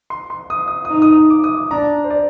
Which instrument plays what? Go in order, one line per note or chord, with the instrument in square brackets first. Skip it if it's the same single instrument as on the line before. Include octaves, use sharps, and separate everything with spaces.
[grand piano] C6
C6
D#6
D#6
D#6
[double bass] D#4
[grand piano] D#6
D6
D#6
D6
[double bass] D4 [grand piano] A#5
[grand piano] C5
D5